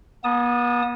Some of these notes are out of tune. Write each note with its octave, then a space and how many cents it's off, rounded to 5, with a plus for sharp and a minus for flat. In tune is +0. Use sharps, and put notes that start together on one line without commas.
B3 -40 A5 +0 D#6 -5